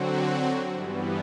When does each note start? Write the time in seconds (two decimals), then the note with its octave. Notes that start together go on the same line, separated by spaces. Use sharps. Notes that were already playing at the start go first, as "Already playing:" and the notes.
Already playing: D3 F#3 C4 F#4
0.70 G2 E3 G3 B3